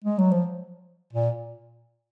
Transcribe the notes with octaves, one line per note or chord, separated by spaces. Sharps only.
G#3
F#3
F3
A#2